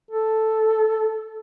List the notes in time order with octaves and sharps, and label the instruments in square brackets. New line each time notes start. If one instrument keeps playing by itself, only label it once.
[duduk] A4